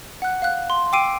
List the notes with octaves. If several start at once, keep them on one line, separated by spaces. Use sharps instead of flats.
F#5 F#6
F5 F#6
C6
G5 D6 E6 C7 D7 D#7